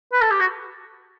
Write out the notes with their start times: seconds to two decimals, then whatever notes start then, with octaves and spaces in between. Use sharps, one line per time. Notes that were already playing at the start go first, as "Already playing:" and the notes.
0.13 B4
0.22 A4
0.31 G4
0.40 F#4